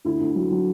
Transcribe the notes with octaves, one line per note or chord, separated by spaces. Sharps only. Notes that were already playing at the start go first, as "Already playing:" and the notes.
D2 E4
D2
F#3
F#3